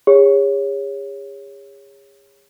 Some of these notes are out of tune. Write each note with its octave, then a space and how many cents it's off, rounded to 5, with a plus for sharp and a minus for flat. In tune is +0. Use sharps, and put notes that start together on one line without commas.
G#4 -40 C#5 +0